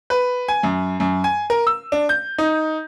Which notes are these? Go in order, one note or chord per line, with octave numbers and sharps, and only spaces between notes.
B4
G#5
F#2
F#2
G#5
A#4
E6
D4
G6
D#4